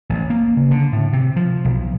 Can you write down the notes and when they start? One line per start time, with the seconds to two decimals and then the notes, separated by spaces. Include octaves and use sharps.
0.09 A1
0.30 A#3
0.57 C#3
0.71 D3
0.93 A2
1.13 C3
1.36 F3
1.65 B1